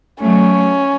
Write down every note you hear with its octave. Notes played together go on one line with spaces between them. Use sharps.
F#3 A3 C#4